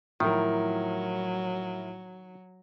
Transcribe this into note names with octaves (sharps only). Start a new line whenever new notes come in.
A2 D#3 F3 F#3 E4 A#4